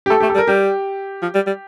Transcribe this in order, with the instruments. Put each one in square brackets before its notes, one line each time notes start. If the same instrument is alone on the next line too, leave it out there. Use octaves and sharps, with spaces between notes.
[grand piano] G4
[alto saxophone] A3 [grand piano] A4
[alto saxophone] A3 [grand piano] G4
[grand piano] A4
[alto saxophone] G3
[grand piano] A#4
[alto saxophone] G3 [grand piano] G4
[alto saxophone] F3
G3
G3